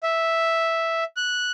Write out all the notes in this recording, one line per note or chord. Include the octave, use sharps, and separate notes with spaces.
E5
F#6